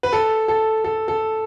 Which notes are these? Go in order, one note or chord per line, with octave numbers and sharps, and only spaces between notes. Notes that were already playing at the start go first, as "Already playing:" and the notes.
B4
A4
A4
A4
A4